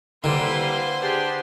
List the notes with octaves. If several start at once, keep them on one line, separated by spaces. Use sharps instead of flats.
D3 E3 G3 A#3 B4 C5 C6
D4 G4 G#4